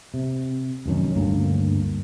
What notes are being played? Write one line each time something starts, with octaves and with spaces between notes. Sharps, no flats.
C3
F1 F#2 D#3 C#4
D2 G2 A#3